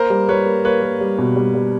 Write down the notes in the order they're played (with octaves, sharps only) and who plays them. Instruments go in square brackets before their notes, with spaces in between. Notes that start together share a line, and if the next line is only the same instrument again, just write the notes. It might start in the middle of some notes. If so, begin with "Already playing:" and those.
Already playing: [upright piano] A#3 [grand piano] A#4 C5
[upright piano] G3
[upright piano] G3 [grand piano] B4 C#5
[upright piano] A#3
[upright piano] A#3 [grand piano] B4 C#5
[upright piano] A#3
G3
B2
G3
G3